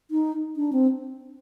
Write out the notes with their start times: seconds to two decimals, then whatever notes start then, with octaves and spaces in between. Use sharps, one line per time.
0.11 D#4
0.57 D4
0.73 C4